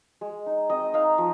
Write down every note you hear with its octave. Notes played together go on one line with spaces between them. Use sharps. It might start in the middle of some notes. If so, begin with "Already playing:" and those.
G#3
D#4
C4 D#5
D#4 F5
F3